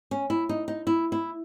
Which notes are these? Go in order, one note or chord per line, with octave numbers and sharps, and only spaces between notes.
C#4
E4
D#4
D#4
E4
E4